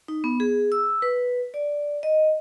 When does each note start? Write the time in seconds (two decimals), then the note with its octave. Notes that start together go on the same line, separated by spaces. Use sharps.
0.08 D#4
0.24 B3
0.40 G#4
0.72 E6
1.02 B4
1.54 D5
2.03 D#5